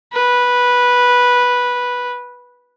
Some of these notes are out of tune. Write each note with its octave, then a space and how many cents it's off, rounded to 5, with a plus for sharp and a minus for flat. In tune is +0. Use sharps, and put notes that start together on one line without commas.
B4 -10